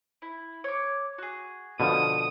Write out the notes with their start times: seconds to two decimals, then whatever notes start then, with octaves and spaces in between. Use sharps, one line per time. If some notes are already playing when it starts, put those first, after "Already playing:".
0.22 E4
0.64 C#5 D6
1.18 F#4 G#4
1.80 B2 D3 F3 C#4 C#6 D#6 D#7